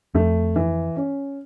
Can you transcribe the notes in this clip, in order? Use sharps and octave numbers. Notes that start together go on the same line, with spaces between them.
F2 A3
E3
C#4